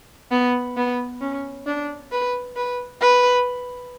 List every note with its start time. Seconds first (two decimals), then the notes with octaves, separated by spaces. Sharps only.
0.31 B3
0.77 B3
1.21 C#4
1.66 D4
2.12 B4
2.56 B4
3.01 B4